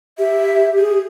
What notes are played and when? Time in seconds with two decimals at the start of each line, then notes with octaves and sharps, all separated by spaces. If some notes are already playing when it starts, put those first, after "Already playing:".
0.18 G4 E5
0.78 G#4